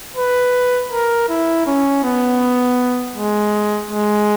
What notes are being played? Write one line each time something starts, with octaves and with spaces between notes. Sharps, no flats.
B4
A#4
E4
C#4
B3
G#3
G#3